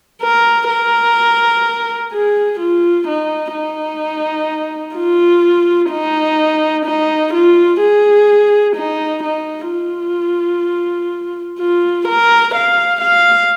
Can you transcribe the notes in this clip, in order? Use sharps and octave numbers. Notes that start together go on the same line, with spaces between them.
A#4
A#4
G#4
F4
D#4
D#4
F4
D#4
D#4
F4
G#4
D#4
D#4
F4
F4
A#4
F5
F5